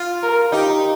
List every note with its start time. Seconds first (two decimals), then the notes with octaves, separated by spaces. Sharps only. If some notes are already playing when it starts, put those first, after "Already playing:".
Already playing: F4
0.23 A#4
0.52 D#4 G4